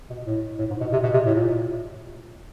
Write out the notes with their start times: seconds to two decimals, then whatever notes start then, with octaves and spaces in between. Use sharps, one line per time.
0.10 B2
0.26 A2
0.59 A2
0.70 G#2
0.81 B2
0.93 C3
1.03 B2
1.13 C3
1.26 A2
1.35 A#2